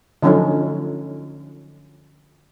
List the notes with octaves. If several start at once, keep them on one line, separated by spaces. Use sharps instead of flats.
D3 F3 F#3 C#4 D#4 A4